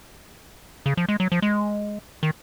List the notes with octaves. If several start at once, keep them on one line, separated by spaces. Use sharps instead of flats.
C#3
F3
G#3
F#3
F3
G#3
D#3